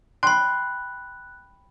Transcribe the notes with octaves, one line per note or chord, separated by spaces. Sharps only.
G5 B5 C6 F#6